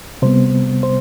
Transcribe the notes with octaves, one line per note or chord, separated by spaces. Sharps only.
C3 G3 B3 C5
C5